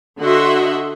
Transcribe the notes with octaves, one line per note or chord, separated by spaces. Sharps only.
D3 F#4 D#5 E5 F#5 C6